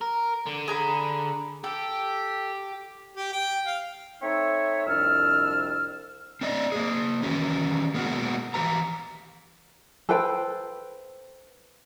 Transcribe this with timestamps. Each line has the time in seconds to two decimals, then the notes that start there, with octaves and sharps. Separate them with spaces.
0.01 A#4
0.46 D3
0.68 G#4 A#5 B5
1.64 G4 A4
3.17 G4
3.32 G5
3.66 F5
4.21 A3 C4 D#4 C#5 E5
4.86 C2 F2 D4 E6 F6
6.41 C4 B4 D5 D#5
6.72 A#3 G#4
7.22 D#3 E3 C#4 F#4
7.94 G#3 A#3 B3 D4 F#4
8.54 E3 F3 G4 B4 A#5
10.09 A4 B4 C5 G5